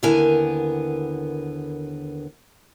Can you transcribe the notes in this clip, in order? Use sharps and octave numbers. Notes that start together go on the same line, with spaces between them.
D#2 D3 B3 E4 A#4 G#5